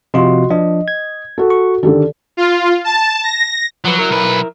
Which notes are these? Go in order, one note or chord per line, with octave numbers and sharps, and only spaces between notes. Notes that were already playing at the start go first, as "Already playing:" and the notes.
C3 F3 F4 F#4 D#5 C6
F3 D4 D#5
G#6
F#4 A4
C#6
D3 D#3 G4 A4
F4
A5
A#6
F3 F#3 B4
E4 A#4
B1 B4